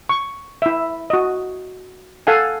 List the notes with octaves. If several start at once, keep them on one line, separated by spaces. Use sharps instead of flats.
C#6
E4 E5
F#4 D#5
A4 F5 F#5 G#5